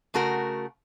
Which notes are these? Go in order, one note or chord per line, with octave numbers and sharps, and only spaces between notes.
C#3 A3 F#4 A#4